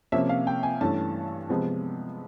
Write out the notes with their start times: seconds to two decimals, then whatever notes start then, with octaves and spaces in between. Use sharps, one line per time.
0.12 C3 F3 A#3 C#4 E5
0.29 F5
0.47 G5
0.63 G#5
0.81 G2 E3 A3 C#4 A5
1.49 C3 F3 G#3 B3